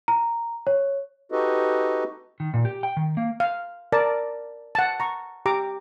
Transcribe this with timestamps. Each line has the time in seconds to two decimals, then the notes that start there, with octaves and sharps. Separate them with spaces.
0.08 A#5
0.67 C#5
1.32 D#4 F#4 G4 A4 B4 D#5
2.40 D#3
2.54 A#2
2.65 G4
2.83 G5
2.97 D#3
3.17 A#3
3.40 F5
3.92 A#4 D5 A5
4.75 F#5 A5
5.00 A#5 C#6
5.46 G4 A#5 D6